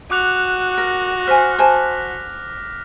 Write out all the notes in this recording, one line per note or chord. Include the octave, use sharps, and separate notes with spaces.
F#4 D6 F#6 F7
A#4 A#6
C5 G#5 F6 B6
C5 G#5 A5